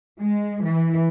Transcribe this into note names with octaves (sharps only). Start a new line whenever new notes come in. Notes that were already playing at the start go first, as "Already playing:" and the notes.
G#3
E3